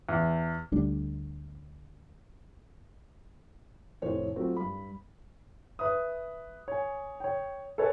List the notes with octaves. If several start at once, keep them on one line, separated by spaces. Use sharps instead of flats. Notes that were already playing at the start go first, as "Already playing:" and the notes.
E2
D2 G3 A3 D4
F1 A2 C5 C#5
F#3 A3 C4 F4
G2 B5
B4 E5 D#6
C#5 G#5
C#5 G5
A4 B4 C#5 D#5 G#5